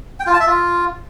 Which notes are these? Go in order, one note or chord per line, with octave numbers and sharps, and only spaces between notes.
G5
F4
A5
E5
F4